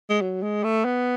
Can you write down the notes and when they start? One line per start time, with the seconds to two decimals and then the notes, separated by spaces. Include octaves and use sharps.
0.09 G#3
0.21 F#3
0.42 G#3
0.64 A3
0.85 B3